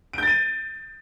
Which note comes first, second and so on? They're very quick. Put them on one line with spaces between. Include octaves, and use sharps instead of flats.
D7 G6 A6 D#7